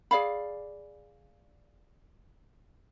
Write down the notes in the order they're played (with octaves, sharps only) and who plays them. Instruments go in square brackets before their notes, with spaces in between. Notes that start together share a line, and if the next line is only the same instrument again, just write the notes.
[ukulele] G#4 D5 F5 B5